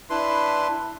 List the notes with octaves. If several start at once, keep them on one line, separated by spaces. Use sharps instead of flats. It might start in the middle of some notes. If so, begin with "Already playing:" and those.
D4 E4 B4 C6